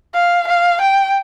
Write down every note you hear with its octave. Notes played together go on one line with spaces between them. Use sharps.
F5
F5
G5